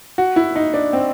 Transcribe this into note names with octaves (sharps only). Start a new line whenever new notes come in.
F#4
E4
D#4
D4
C4